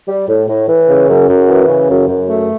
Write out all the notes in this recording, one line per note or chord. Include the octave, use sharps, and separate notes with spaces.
G3
A2
A2
E3
C#3
F#2
F#2
E3
C#3
F#2
F#2
A3